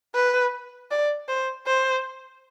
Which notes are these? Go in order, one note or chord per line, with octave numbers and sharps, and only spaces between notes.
B4
D5
C5
C5